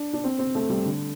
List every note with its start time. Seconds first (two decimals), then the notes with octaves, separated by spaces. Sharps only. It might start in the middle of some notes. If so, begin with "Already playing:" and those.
Already playing: D4
0.13 D4
0.24 C4
0.39 C4
0.55 A3
0.70 G3
0.85 D3